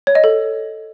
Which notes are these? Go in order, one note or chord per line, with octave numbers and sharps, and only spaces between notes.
C#5
D#5
A4